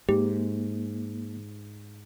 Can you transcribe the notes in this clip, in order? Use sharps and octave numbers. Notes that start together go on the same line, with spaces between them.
G#2 A#3 G4